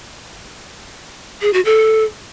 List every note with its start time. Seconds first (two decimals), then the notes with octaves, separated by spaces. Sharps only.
1.42 G#4
1.53 F#4
1.65 A4